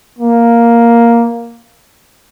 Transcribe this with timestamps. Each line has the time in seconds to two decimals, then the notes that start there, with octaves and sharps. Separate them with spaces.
0.19 A#3